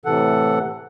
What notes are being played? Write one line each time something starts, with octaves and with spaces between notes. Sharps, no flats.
A2 C3 E3 A4 F#5